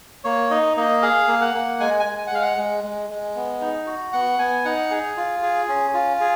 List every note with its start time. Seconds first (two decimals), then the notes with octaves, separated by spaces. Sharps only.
0.24 A#3 C#5
0.50 D#4 D#5
0.77 A#3 D#5
1.02 G#4 F5
1.28 A#3
1.41 F#5
1.54 A#3
1.80 G#3 G#5
2.00 G#5
2.06 G#3
2.18 G#5
2.27 F#5
2.31 G#3 F5
2.42 F#5
2.58 G#3
2.84 G#3
3.10 G#3
3.36 B3
3.61 D#4
3.87 F#4
4.13 B3 F#5
4.39 B3 G#5
4.65 D#4 F#5
4.91 G#4
5.17 F4
5.42 G#4
5.69 C#4
5.94 F4
6.20 G#4